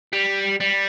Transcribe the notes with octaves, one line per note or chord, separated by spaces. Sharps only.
G3
G3